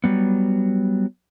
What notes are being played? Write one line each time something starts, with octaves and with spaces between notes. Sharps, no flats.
F#3 G3 B3